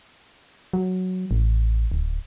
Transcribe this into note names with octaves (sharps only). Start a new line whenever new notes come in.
F#3
A1
D1